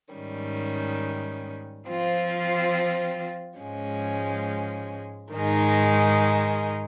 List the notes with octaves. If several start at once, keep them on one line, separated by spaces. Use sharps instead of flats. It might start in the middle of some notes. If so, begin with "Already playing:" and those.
G#2 D#3 G3 C#4
F3 C4 F4
G#2 F3 G#3 C#4
G#2 D#3 G#3 D#4